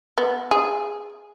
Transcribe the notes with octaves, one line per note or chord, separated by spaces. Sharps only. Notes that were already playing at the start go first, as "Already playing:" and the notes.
B3
G#4